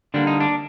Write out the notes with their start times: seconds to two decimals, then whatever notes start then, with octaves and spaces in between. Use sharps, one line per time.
0.14 D3 G3 A#3 D4
0.27 D#4
0.40 D4